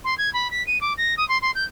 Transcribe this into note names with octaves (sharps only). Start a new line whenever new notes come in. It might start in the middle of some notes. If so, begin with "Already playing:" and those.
C6
G#6
B5
B6
D#7
D6
A#6
D#6
C6
C6
G6